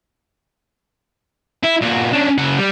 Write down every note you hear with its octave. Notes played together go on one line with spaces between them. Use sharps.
E4
A#2 F#4
C#4 D4
C#3 F#5
G3